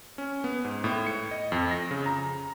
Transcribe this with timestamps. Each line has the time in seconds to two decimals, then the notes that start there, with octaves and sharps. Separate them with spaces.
0.18 C#4
0.44 B3
0.65 G#2
0.84 A2
1.06 C#7
1.31 D#5
1.52 F2
1.71 A#6
1.91 C#3
2.06 A#5